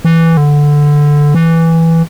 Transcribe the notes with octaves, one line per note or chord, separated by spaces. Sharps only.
E3
D3
E3